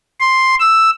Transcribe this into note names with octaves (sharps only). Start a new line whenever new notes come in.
C6
E6